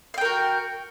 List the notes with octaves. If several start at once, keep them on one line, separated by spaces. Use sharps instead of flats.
F#4 A#4 F5 G5